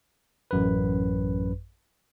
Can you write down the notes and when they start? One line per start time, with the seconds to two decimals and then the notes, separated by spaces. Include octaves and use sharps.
0.51 A1 F#2 B4